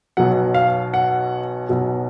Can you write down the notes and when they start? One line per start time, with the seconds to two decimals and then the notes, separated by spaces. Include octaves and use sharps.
0.17 B1 B2 F#3 F#5
0.54 F5
0.94 F#5
1.69 B1 B2 F#3